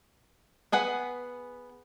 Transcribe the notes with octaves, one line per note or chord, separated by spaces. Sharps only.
B3 G#4 B4 F#5